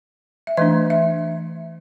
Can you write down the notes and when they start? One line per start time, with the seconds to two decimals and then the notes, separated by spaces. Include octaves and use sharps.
0.47 E5
0.57 E3 A3 D4 D#5
0.90 E5